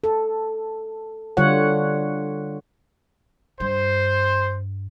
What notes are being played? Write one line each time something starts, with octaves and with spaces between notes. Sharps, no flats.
A4
D3 G3 F4 C#5 F#5
G2 C5